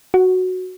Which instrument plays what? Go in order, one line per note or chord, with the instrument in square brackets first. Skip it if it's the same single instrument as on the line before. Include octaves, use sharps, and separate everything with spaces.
[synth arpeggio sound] F#4